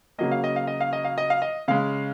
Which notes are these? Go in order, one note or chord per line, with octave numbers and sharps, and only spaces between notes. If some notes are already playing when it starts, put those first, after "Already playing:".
C#3 F#3 A#3 D#5
F5
D#5
F5
D#5
F5
D#5
F5
D#5
F5
D#5
C#3 G#3 F5